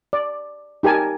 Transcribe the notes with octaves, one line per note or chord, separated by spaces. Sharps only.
D5
D#4 G4 A#4 G#5 A5